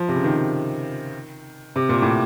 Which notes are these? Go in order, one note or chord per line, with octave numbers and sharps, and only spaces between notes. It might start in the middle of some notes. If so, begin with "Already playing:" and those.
Already playing: F3
C3
C#3
D#3
C3
A#2
A2